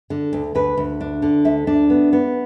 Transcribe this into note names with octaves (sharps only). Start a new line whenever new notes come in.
D3
D2
D2 B4
D2
D4
D3
D2 E5
D4
B3
B3